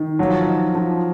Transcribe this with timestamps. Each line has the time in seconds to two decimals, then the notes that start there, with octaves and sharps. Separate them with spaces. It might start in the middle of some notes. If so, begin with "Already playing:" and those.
Already playing: D#3
0.19 F3 F#3
0.47 D#4
0.75 F3